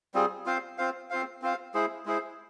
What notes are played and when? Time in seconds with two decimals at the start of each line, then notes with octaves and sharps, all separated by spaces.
0.14 G3 C4 F4 G#4
0.46 C4 F4 C5 F5
0.78 C4 F4 C5 F5
1.10 C4 F4 C5 F5
1.42 C4 F4 C5 F5
1.74 G#3 E4 G#4 C5
2.06 G#3 E4 G#4 C5